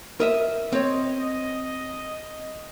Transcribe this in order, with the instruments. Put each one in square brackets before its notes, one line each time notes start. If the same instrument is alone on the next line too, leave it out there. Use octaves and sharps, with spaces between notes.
[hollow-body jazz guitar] A#4 D#5 E5
[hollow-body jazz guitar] C4 C#5 [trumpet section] D#5